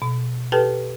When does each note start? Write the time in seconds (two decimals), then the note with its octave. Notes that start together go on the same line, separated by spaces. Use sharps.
0.02 B2
0.52 G4 A4 B4 G5 A5